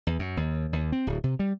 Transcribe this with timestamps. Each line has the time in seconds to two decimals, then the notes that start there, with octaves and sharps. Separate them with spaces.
0.07 E2
0.19 F#2
0.37 D#2
0.73 D#2
0.92 C4
1.07 D1
1.24 C3
1.39 G3